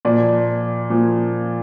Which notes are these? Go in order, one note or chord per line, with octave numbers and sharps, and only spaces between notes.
A#2 F3 D5
A#2 F3